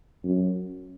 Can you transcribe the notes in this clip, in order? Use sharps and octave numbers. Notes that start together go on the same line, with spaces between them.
F#2